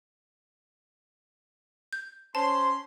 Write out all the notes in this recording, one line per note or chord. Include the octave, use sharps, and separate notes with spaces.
G6
C#4 C5 A5 C6